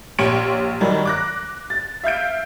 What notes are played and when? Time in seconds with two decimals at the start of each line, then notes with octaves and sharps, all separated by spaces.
0.18 A#1 G4 C#5 C6 D7 F#7
0.81 F#2 D#3 F#3 G3
1.05 D6 F#6 A#6
1.70 A6
2.04 E5 F5 G6 D7